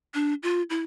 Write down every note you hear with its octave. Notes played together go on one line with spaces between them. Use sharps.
D4
F4
E4